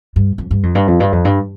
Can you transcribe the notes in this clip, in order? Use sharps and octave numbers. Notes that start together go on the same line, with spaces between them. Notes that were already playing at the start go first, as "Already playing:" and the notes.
G2
F2
G2
F2
G2
F2
G2
F2
G2